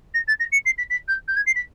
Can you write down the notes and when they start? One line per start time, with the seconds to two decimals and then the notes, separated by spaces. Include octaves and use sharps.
0.14 A#6
0.28 A6
0.40 A#6
0.52 C#7
0.65 C7
0.78 B6
0.90 B6
1.08 G6
1.28 G6
1.36 G#6
1.46 C7
1.56 B6